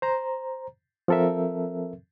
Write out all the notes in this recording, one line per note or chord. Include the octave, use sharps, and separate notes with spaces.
C5 A#5
F3 C4 A4 A#4 E5